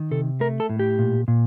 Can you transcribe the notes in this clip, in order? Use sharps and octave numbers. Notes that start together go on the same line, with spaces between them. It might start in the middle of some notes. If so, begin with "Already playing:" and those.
Already playing: D#3
C3 A4
A3 A#4
A4
A2
G4
A#2
A#2